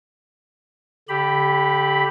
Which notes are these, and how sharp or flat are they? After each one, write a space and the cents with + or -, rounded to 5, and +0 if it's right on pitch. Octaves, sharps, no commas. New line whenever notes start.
D3 -30 G4 +0 B5 +0